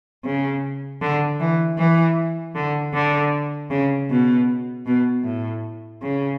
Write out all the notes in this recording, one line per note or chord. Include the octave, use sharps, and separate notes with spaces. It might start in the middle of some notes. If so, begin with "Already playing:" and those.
C#3
D3
E3
E3
D3
D3
C#3
B2
B2
A2
C#3